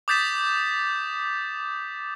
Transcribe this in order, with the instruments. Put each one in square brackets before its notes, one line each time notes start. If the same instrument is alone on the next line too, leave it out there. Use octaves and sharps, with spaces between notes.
[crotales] D6 D#6 G6 A6 B6 E7